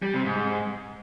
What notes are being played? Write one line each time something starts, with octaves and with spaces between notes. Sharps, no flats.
G3
C3
G#2